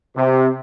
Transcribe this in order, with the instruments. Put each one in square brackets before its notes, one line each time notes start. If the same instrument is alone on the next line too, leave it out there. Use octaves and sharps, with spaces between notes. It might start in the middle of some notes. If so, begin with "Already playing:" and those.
[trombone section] C3